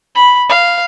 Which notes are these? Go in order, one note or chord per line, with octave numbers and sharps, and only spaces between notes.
B5
F5